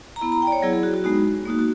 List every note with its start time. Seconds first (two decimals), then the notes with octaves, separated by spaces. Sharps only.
0.16 A#5
0.21 B3 E4 B5
0.32 A#5
0.42 G5
0.47 D5
0.52 C#5
0.62 F#3 B3 E4 G#4
0.73 G#4
0.83 F#4
0.94 F#4
1.04 G#3 B3 D#4 F#4
1.45 A#3 D#4 F#4
1.59 F#4